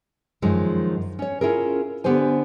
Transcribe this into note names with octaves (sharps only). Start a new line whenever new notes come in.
F#2 D#3 F3 G#3
C#4 C#5
C#4 E4 F4 G#4 A#4
D3 B3 G4 C5 G#5